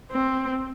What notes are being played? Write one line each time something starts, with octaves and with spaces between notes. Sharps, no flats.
C4